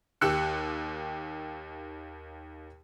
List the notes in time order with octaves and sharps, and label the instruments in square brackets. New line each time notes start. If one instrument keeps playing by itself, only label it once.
[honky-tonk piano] D#2 G4 E6 F#6 C#7